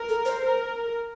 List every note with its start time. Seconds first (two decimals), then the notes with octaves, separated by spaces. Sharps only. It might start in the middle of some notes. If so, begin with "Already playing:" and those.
Already playing: A#4
0.09 A4
0.25 C5
0.41 A#4